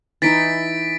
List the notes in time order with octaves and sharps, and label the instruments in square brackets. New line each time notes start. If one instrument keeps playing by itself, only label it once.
[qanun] E3 D#4 E4 [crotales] A6 B6 D7